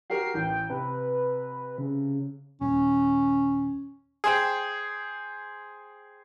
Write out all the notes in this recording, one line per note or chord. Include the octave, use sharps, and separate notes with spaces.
F#4 G4 A#4 C7
A1 G5
C3 B4
C#3
D#1 C#4
G#4 C5 G5